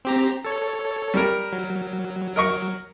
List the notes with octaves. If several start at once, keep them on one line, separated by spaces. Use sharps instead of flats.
C4 G4 A#5
A4 C#5
G3 A#4
F#3
A#4 D#5 C#6